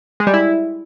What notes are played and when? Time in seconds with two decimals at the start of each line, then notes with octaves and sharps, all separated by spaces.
0.20 G#3
0.27 G3
0.34 E4